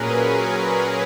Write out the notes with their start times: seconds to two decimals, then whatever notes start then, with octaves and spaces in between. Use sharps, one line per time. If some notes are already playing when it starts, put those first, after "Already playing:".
Already playing: A#2 F#3 C#4 G#4 A#4 B4
0.23 A#4